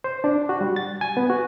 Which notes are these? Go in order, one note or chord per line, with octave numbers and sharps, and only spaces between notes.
C5
D4
F#4
G3
A6
G#5
B3
F#4